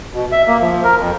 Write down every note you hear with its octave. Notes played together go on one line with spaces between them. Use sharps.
B2
E5
A#3
F3
A#4
F2